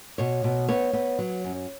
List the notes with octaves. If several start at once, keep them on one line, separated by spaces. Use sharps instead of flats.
B2 C#5
B2
B3 C#5
B3
F#3
F#2